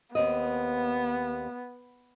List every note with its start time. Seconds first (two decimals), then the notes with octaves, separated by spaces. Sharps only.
0.15 D#2 B3 C4 D#5